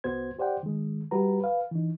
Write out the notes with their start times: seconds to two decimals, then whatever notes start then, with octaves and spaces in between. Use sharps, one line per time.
0.04 C2 B3 F#4 C5 G#6
0.38 G4 C5 D5 F#5 G5
0.63 D#3 G#3
1.11 G3 F#4 G4 B4 A#5
1.40 B4 F5
1.71 E3 D#4